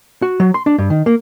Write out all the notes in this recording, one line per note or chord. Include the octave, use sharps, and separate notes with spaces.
F#4
F#3
C6
D4
G2
D#3
A#3